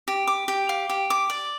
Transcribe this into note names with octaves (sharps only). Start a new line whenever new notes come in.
G4
D6
G4
F5
G4
D6
D5